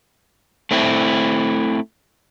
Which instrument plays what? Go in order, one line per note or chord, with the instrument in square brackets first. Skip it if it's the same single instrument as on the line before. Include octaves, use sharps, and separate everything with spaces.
[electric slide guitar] A3 C4 E4